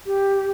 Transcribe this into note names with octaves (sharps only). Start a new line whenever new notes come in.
G4